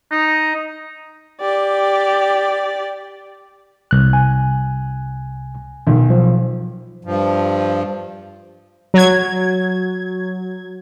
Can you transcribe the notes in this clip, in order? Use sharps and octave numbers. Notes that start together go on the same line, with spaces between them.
D#4
G4 D5
C2 F#6
G#5
B1 D#3
F3 F#3
G2 F3
F#3 G#6